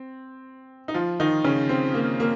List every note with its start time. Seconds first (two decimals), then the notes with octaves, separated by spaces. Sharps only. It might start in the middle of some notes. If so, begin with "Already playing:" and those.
Already playing: C4
0.88 D#4
0.94 F3 F4
1.20 D#3 D#4
1.44 C#3 C#4
1.69 C4
1.94 A#3
2.20 A#3